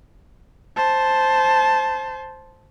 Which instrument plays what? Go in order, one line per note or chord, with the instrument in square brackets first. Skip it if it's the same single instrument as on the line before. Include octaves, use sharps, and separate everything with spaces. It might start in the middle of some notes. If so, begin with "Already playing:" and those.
[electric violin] C5 A5